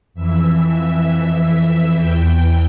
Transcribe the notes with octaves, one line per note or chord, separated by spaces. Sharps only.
F2 E3 E5
E2 E3 G5
G5